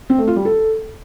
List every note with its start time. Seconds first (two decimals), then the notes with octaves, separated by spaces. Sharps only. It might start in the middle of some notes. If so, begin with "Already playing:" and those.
0.10 C4
0.18 A3
0.27 F4
0.36 G3
0.45 A4